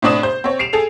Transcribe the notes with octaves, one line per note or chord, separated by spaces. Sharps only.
A2 C4 D4 D5 D#6 E7
C5 G6
C4 C#5
C7 D7 E7 F7
G#4 A4 F7